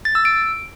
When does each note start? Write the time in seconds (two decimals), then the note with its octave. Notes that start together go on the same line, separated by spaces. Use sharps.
0.05 A6
0.15 E6
0.25 D7